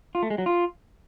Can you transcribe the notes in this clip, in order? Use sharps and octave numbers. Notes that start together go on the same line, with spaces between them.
F4
A3
G#3
F#3
F4